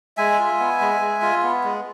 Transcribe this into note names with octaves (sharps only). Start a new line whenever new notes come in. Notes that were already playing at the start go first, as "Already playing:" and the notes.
G#3 E5 G#5
F4
B3
G#3
G#3
F4
B3
G#3